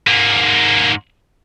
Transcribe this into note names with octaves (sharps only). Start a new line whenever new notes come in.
G#2 A#3